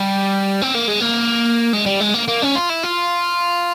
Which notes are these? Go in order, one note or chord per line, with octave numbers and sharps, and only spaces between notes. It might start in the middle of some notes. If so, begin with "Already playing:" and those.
Already playing: G3
C4
A#3
G#3
A#3
G#3
G3
G#3
A#3
A#3
C#4
F4
E4
F4